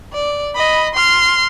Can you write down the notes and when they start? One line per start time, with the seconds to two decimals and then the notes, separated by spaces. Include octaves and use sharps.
0.13 D5
0.55 D#5 B5
0.94 C6 F6